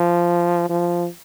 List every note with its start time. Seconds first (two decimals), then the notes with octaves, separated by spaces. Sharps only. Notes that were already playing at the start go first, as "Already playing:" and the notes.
Already playing: F3
0.69 F3